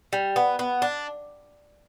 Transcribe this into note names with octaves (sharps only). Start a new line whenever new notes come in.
G3
B3
B3
D4